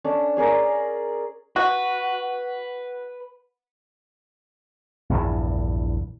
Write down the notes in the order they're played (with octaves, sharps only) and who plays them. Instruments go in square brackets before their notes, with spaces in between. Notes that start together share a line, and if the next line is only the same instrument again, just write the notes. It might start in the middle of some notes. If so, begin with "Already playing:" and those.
[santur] C#4 D4 A4
C#4 G#4 A#4 D5
[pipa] F#4 [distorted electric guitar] B4
[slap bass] A#1 E2 G2 E3